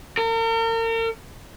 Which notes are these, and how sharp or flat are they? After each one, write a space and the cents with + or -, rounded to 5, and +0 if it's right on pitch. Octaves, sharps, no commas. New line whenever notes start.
A#4 -40